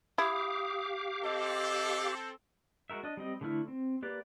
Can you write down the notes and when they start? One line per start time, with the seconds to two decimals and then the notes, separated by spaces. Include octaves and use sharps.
0.18 E4 G4 F5 D6 D#6
1.24 C4 A4 D#5
2.90 G#3 F#4 A#4 E5
3.03 D4 D#5
3.17 G3 C4 D#5
3.41 D3 E3 A3 E4 F6
3.68 C4
4.02 A#3 G4 B4 D5